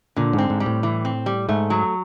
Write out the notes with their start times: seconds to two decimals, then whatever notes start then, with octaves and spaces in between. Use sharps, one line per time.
0.16 A#2 D3
0.33 G#2
0.38 C4
0.50 G#2
0.60 G3
0.66 A2
0.83 E3
1.05 C4
1.26 G3
1.49 G#2 A3
1.70 F#3